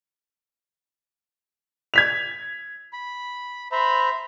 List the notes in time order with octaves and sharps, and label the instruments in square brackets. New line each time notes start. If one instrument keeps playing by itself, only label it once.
[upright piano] G#6 B6 F7
[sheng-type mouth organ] B5
[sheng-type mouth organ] C5 E5 A#5 [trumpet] B5